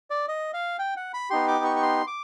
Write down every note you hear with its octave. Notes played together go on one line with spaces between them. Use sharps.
D5
D#5
F5
G5
F#5
B5
B3 D#4 G4 C6
D6
C#6
C#6
C6
D6